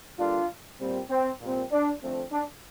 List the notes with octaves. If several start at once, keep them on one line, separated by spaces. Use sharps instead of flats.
D3 G3 A#3 D4 F4
A#2 G3 C4
C4
A#2 G3 C4
D4
D3 F3 A3 C4
D4